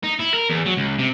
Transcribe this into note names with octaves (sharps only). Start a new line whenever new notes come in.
D#4
E4
A#4
E2
F#3
C#2
C3